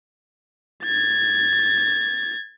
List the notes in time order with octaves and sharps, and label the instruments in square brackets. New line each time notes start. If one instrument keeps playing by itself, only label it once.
[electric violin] G#6 A6